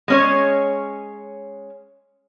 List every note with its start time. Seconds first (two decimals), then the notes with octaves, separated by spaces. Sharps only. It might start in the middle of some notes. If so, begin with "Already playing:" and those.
0.08 G#3 C#4 C#5